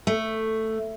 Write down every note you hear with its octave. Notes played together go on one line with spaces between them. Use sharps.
A3